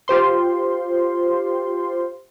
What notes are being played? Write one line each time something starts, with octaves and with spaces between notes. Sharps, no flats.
F4 G4 C5 C6